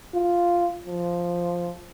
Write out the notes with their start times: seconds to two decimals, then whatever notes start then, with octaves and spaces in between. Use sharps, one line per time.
0.15 F4
0.86 F3